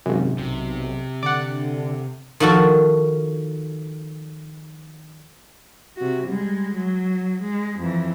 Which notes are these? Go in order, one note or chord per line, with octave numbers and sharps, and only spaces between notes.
G#1 F#2 C3
B1 C3
D3 D5 F#5
D#3 F3 F#4 A4
C3 F#4
G3 G#3
F#3
G#3
F2 E3